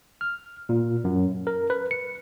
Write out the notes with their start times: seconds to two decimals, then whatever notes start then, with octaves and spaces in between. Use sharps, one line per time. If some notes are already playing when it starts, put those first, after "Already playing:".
0.21 F6
0.69 A#2
1.04 F#2
1.47 A#4
1.70 B4
1.91 C#7